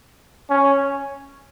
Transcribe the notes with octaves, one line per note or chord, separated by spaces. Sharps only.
C#4